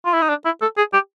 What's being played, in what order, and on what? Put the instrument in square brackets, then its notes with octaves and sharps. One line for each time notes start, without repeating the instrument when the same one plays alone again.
[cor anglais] F4
E4
D#4
D4
E4
A4
G#4
G4